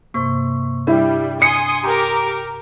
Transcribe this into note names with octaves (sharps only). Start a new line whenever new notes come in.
G2 C3 A#3 C#6
G3 D4 E4
G#5 C6 D#6 C#7
G4 A#4 A#5 D6